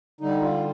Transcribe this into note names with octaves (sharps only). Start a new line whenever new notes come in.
D3 G3 D#4
F4